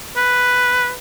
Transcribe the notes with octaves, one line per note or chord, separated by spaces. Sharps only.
B4